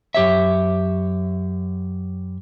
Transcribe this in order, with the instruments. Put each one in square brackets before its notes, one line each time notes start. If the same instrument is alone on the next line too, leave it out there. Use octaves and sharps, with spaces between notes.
[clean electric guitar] F#2 G4 C#5 E5